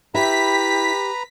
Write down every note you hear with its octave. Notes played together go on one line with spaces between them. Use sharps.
E4 G4 B4 E5 A#5 B6